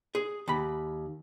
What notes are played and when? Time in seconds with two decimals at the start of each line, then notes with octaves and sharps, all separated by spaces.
0.15 G#4
0.48 D#2 B5